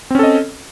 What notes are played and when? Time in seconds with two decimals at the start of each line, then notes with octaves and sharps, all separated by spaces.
0.11 C4
0.15 C#4
0.19 A4
0.23 D#5